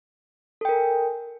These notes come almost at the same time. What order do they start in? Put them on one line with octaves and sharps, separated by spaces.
A4 G5 A#4 G#5